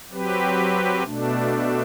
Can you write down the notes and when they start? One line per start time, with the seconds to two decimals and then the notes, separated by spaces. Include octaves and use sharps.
0.11 F#3 C4 G4 B4
1.03 B2 A3 D4